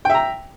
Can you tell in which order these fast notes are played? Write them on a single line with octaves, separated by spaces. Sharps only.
G5 E5 A#5